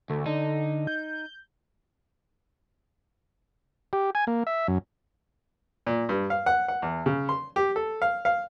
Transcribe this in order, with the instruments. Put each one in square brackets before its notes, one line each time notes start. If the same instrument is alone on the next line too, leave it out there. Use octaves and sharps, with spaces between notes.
[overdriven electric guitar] D2 [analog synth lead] A3
[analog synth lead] D3 [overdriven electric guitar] D#4
[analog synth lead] G6
[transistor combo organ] G4
G#5
A#3
E5
F#2
[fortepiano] A#2
G2
F5
F#5
F#5
E2
C#3
C6
G4
A4
F5
F5